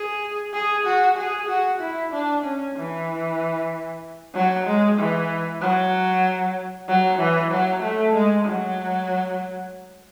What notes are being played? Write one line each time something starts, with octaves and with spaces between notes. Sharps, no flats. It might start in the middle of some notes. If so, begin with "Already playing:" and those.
Already playing: G#4
G#4
F#4
G#4
F#4
E4
D4
C#4
E3
F#3
G#3
E3
F#3
F#3
E3
F#3
A3
G#3
F#3